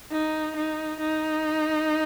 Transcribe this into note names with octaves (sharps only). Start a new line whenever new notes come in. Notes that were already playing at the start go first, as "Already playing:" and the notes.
D#4
D#4
D#4